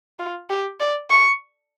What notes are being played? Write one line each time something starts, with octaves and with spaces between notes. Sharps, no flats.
F4
G4
D5
C#6